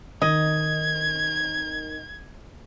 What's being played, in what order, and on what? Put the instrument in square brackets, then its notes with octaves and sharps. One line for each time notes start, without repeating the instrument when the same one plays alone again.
[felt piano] D#3 [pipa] D#5 [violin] G#6